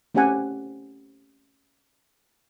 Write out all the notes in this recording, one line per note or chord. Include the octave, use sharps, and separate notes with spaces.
A3 C4 C#4 G4 F#5 G#5